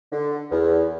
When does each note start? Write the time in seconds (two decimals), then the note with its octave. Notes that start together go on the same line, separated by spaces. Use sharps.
0.12 D3
0.51 E2